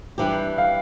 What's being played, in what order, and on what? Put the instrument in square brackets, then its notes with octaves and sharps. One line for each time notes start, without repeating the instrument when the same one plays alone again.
[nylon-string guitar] E3 G3 D4 G4
[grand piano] F5